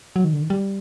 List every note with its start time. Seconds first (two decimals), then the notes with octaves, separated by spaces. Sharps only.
0.16 F#3
0.24 D#3
0.33 D3
0.42 D#3
0.50 G3